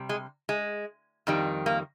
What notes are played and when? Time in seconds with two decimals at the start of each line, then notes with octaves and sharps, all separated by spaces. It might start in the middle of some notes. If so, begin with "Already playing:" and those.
Already playing: C3 G3
0.09 G#3
0.49 G#3
1.27 F2 D#3 G3
1.66 A#3